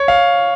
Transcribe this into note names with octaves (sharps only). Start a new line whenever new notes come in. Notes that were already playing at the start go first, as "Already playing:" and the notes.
Already playing: C#5
F5